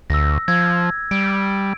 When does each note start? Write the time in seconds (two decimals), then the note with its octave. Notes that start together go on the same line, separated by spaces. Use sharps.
0.10 D2 E6 A#6
0.48 F3 E6 G#6
1.11 G3 D7